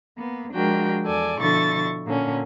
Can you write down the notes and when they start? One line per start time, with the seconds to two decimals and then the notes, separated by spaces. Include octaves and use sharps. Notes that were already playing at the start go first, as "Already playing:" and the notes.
0.18 A#3 B3
0.53 F3 G#3 D4 F#4 A#4 G5
1.05 E2 A4 D5 G#5
1.39 B2 D3 F3 E4 C#6 A6
2.06 A#2 D3 C#4